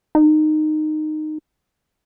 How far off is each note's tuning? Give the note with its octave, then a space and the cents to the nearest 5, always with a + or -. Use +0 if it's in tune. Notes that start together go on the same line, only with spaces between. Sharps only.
D#4 -15